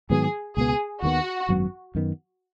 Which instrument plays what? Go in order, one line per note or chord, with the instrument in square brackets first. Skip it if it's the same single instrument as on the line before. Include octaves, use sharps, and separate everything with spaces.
[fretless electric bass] G#2 D#3 F#3 B3 [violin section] G#4
[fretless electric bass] C#2 B2 B3 [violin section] G#4
[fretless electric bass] D#2 D#3 F#3 B3 [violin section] F#4
[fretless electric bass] G#1 F#2 F#3 B3
F#2 D#3 B3